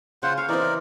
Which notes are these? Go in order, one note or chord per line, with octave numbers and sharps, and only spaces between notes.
C#3 F4 C5 F#5
C#5 F5
E3 C4 D#4 A#4 D5